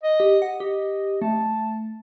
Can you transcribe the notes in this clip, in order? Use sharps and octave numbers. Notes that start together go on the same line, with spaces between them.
D#5
G4
F#5
G4 D#5
A3 A5